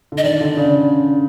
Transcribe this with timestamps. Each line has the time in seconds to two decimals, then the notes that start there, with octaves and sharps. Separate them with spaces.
0.12 D3
0.18 D#5
0.24 D#3 D5
0.41 D3
0.57 C#3